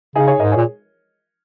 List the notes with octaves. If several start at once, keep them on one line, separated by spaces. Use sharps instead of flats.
C#3 D#4 G#4
G#4 C#5
G#2 A#4 D#5
G#4 C#5
A#2